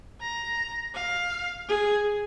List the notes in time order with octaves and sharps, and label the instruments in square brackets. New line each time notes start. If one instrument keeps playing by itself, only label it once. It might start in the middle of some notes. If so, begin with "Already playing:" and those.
[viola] A#5
F5
G#4